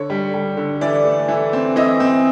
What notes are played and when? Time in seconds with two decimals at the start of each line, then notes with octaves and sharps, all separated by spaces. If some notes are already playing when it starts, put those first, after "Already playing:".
Already playing: D3 C#5
0.10 G3
0.34 G3
0.57 D3
0.81 E3 D5
1.05 A3
1.28 E3
1.53 C4
1.76 E3 D#5
2.00 C4